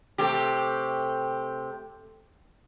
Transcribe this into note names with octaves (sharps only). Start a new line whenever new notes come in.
C3 A3 G4